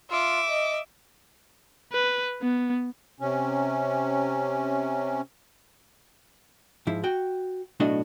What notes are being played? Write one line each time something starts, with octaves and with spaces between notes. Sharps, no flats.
F4 E5 D6
D#5
B4
B3
C3 C#4
G#2 F3 E4
F#4 G5
B1 A2 A3 D4 F#4 D#5